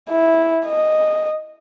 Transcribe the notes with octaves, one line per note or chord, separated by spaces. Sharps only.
E4
D#5